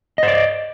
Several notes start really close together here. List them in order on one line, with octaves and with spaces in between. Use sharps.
D#5 C5 D5